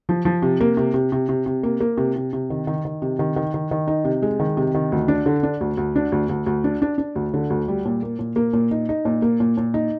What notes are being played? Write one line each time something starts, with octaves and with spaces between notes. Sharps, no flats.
F3
F3
C3
A#3
C3
C3
C3
C3
C3
A#3
A#3
C3
C3
C3
D#3
D#3
D#3
C3
D#3
D#3
D#3
D#3
D#4
C3
G#3
D#3
C3
D#3
D2
D4
D3
D4
D2
D2
D4
D2
D2
D2
D4
D4
D4
D2
D3
D2
G3
A#2
A#3
A#2
A#3
A#2
D#4
D#4
A#2
A#3
A#2
A#2
D#4